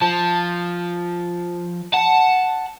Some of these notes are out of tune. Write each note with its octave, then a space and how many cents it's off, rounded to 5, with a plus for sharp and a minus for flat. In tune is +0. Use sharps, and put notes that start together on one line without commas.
F3 +0 A5 +0
F#5 +0 A5 +0